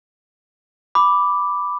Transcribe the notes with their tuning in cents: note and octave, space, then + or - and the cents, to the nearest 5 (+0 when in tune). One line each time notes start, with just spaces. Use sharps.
B5 +0 D6 +0